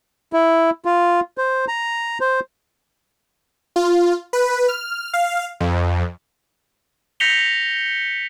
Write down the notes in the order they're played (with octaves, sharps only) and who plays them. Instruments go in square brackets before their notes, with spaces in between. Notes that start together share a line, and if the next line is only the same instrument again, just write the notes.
[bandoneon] E4
F4
C5
A#5
C5
[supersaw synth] F4
B4
F6
F5
F2
[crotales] G6 A#6 B6 C#7 F7 G7